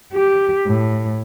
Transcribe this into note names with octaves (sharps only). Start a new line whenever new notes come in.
G4
A2